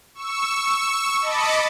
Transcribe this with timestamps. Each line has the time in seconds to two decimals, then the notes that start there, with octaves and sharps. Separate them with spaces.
0.14 C#6 E6
1.21 D#5 A5 B5 D6 C#7